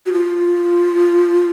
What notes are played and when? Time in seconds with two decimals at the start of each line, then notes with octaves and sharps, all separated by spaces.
0.06 F#4
0.13 F4